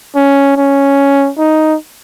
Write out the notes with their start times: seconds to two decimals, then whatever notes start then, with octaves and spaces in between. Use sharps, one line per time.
0.15 C#4
0.56 C#4
1.39 D#4